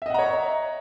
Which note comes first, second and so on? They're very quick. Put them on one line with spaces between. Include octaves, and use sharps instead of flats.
E5 D#5 F#5 A#5 C#5